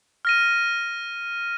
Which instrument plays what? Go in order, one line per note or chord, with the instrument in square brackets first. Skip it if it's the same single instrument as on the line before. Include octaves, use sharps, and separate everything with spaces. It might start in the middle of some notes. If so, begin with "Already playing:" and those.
[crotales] F6 A#6 D#7